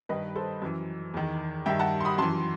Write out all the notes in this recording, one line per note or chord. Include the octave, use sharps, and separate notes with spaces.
G2 D#3 B4 D#5
A4 C5
F#2 E3
E2 D#3
G2 D#3 E5 G5
F#5 A5
C6
B5 D#6
F#2 E3 A5 C6